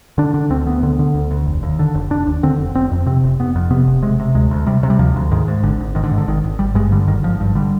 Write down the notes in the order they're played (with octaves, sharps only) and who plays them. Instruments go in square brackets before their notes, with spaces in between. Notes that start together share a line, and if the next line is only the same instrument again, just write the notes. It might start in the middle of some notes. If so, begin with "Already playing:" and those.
[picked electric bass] D3 D4
D3 D4
D2 C4
D2 B3
D3
D3
D2
D2
F1
D#2
D3
F1
F1 D4
D#2
D3 C4
F1
F1 C4
F2
C3 C4
F1
F1 B3
F2
C3 B3
F1
C3 G#3
C3
D2 G#3
D2
C3 G3
C3
G3
D2 F3
D2
G#2 D#3
G#2
G#1 D3
G#1
G#2 D#3
D3
G#2
D3
G#1 D#3
G#1
G#1 G3
G2 G#3
D3 G3
G#1 D#3
G#1 F3
G2
D3 G3